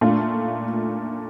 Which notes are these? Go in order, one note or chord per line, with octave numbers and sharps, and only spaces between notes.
A#2 A3 D4 F4